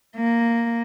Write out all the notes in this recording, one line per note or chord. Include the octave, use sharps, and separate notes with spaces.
A#3